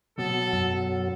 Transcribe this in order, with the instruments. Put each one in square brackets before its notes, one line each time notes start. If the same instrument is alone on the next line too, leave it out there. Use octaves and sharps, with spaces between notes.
[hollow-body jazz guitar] B2 [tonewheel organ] F#3 [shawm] A4
[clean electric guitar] F#2